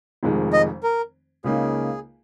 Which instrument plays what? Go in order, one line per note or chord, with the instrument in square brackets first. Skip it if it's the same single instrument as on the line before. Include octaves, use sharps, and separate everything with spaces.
[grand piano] F1 F2 D#3 G#3
[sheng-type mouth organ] D#5
A#4
[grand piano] C#2 C#3 A#3 D#4 [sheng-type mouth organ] G#4